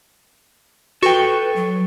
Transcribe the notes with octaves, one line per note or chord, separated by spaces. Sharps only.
F#4 A4 B4 G5 C#6
F#3